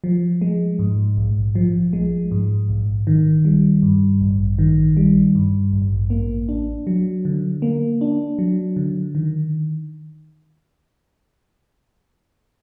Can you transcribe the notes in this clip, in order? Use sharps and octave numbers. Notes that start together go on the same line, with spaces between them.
F3
G#3
G#2
A#1
F3
G#3
G#2
A#1
D#3
G3
G2
A1
D#3
G3
G2
A1
A#3
D4
F#3
D3
A#3
D4
F#3
D3
D#3